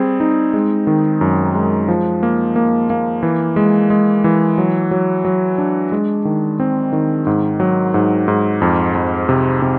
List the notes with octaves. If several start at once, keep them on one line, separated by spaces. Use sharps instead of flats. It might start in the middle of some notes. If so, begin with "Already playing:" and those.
Already playing: G3 C4 G#4
D#4
G#3
D#3
F#2
G#3
F3
A#3
A#3
A#3
E3
G#3
G#3
E3
F#3
F#3
F#3
D4
G#3
D#3
C4
D#3
G#2
F#3
G#2
G#2
F2
F2
C3
C3